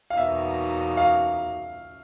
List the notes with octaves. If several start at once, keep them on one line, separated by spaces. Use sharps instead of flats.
F5
E2 B2 F#3 A#3 D#4 E5
F5